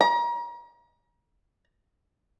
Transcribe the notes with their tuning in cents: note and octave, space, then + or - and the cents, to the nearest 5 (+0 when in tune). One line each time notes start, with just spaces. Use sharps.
A#5 +35